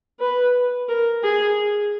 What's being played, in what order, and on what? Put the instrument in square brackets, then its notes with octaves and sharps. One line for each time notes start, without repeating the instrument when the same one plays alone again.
[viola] B4
A#4
G#4